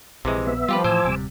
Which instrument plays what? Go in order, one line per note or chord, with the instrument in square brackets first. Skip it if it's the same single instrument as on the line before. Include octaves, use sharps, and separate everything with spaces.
[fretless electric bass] A#1 [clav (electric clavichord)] C3 E3 G#3
[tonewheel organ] B3 E5
[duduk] F3 [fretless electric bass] G3 [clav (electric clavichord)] F4 G4 B4
[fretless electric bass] A2 E3 [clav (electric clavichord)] C5 [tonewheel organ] G#5 D6 E6
[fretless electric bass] D1 C3 G3